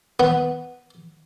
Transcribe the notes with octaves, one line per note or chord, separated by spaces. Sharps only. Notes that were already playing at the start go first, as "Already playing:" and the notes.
B3